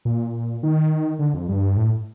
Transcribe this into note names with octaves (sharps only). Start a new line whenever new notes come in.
A#2
D#3
D3
F2
G2
A2